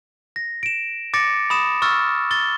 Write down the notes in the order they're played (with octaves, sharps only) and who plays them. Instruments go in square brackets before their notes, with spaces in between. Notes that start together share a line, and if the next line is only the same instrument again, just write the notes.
[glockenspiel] A#6
D7 E7
D6 A6 A#6 C#7 D7
B5 D#6 E7
C#6 E6 F6 A6
A6 G7